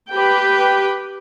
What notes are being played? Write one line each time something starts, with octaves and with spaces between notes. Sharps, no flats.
G4 B4 G5